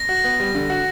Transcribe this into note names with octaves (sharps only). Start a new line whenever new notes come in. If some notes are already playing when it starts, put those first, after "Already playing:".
Already playing: A#6
F#4
B3
G3
D3
F#4